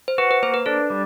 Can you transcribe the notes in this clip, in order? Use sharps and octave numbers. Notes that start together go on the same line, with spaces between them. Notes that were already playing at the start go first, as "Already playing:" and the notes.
C5
F#4 B4
B4
A#3 C5
B4
D4 A4
G3